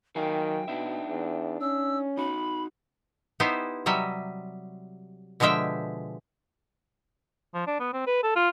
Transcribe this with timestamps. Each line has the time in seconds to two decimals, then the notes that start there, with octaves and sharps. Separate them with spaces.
0.16 D#3 F#3 F5 G5 G#5
0.68 B2 D4 D#4 E5
1.07 E2
1.61 C#4 E6
2.17 D#4 F#4 B5
3.40 B3 D#4 E4 G4 C5 G#5
3.86 C3 F#3 G3 D#5 E5
5.40 B2 D3 F3 G#3 E5 G5
7.54 F3
7.67 D4
7.79 B3
7.93 C4
8.07 B4
8.23 A4
8.36 F4